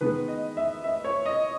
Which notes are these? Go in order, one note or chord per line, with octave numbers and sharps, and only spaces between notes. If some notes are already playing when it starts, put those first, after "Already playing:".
D#3 G#3 B3 B4
D#5
E5
E5
C#5
D#5